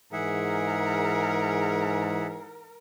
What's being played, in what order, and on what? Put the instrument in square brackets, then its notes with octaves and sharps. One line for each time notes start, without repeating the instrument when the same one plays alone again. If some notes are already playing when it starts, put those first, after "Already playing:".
[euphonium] G#2 [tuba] E3 [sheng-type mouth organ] G#4 E5 F#5 [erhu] A#4